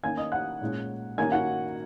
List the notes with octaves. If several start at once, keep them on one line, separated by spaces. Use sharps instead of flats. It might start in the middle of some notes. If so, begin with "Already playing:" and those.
D#3 A#3 C#4 G#5 G#6
D#5 D#6
F#5 F#6
A#2 G#3 C#4
D#3 A#3 C#4 G#5 G#6
F#4 F#5